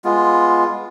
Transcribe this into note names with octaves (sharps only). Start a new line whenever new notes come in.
G#3 B3 F4